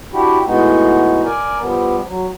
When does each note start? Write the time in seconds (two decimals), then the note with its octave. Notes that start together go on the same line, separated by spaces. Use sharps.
0.13 D4 E4 F#4 G4
0.47 A2 G#3 B3 D#4 F#4
1.25 A#4 D5 G#5
1.60 F3 G3 B3
2.07 F#3